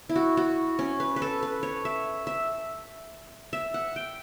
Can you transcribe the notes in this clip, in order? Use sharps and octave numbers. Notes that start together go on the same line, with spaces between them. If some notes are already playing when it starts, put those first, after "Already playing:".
E4
F#4
F#4
C#4
B4
B4
A4
B4
C#5
E5
E5
E5
F#5
G5